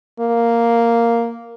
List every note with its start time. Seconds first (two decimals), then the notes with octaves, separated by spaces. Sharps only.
0.20 A#3